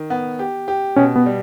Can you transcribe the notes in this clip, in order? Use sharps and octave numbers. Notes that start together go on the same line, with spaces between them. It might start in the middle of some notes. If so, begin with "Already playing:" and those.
Already playing: D#3
B3
G4
G4
B2 C#4
B3
G3